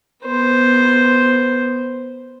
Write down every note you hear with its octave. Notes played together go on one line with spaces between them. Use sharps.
B3 C5